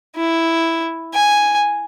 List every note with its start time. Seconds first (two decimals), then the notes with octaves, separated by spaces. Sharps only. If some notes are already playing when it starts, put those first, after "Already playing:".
0.16 E4
1.14 G#5